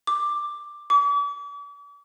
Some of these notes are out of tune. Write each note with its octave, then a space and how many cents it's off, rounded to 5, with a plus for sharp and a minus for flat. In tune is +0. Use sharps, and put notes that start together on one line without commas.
D6 +10
D6 -40